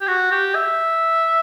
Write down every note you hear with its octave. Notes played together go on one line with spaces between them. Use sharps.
G4
F#4
G4
E5